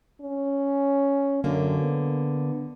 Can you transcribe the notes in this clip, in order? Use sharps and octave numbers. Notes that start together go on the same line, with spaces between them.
C#4
F#2 D3 A#3
B3